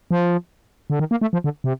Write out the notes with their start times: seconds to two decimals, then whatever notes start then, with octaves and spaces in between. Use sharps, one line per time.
0.11 F3
0.90 D3
0.99 D#3
1.11 A#3
1.21 A3
1.33 F3
1.44 D3
1.64 C3